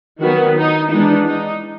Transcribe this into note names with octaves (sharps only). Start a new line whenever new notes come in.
D#3 F#3 B3 F#4
D#4
E3 G#3 B3 D4 D#4
D#4